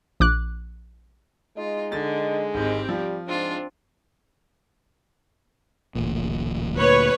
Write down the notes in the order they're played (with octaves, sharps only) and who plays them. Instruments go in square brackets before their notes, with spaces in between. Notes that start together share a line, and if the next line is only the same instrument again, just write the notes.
[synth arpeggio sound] A#1 D6 F#6
[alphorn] G#3 [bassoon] D#4 [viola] F4
[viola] D3 [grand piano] A6
[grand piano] G#1 [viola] C4 G4
[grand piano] F3 [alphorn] G3
[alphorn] G#2 [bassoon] C4 [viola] D4 F4
[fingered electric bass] D1 A1 A#2
[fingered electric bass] D2 A#2 [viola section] B4 C#5